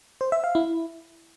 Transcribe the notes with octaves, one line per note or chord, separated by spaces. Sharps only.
C5
E5
F5
E4